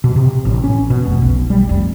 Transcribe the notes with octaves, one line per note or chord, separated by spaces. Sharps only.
B2
C3
A1
C#4
B2
F1
B1
G3
F1